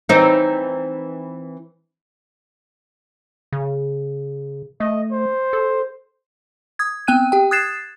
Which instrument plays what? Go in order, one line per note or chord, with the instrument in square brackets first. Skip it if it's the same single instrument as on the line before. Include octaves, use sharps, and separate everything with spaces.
[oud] E3 C4 D#4
[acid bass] C#3
[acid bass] A3 [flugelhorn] D#5
[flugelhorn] C5
[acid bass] A4
[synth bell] D#6 G#6
B3 C4 G5 F#6 D#7
G4 G5
D#6 F#6 G#6 A6 C7 E7